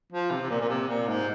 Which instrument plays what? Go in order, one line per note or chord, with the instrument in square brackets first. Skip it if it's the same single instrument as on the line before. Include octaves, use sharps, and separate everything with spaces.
[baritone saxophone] F3
C3
C3
A#2
A#2
C3
A#2
G#2